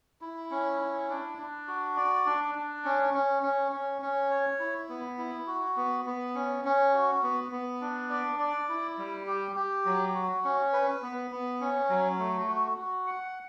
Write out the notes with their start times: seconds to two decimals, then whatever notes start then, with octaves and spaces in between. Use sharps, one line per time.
0.21 E4
0.51 C#4
0.80 E4
1.10 D4
1.38 D4
1.67 F#4
1.96 D5
2.26 D4
2.55 D4
2.85 C#4
3.14 C#4
3.43 C#4
3.72 C#4
4.02 C#4
4.30 C#5
4.60 E4
4.89 B3
5.18 E4
5.47 F#4
5.76 B3
6.06 B3
6.35 C#4
6.65 C#4
6.94 F#4
7.23 B3
7.52 B3
7.81 D4
8.10 D5
8.39 D5
8.69 E4
8.98 G3
9.27 G4
9.56 G4
9.85 F#3
10.15 F#4
10.44 C#4
10.73 B4
11.02 B3
11.31 B3
11.61 C#4
11.89 F#3
12.19 A3
12.48 F#4
12.78 F#4
13.07 F#5